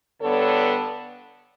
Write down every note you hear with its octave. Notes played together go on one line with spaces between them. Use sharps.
G2 D3 G3 B3 A4 C#5